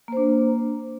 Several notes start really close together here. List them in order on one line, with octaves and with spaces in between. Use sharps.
A#3 C5 D4